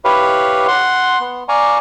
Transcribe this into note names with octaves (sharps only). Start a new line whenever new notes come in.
E4 G4 B4 C#5 F5
F#5 C6
B3
D5 F5 G#5 A#5 C#6